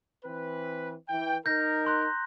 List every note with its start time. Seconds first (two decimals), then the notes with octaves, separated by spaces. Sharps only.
0.25 E3 C4 B4
1.09 E3 G5
1.46 D#4 A#4 G6 A#6
1.85 A#5 C6 F#6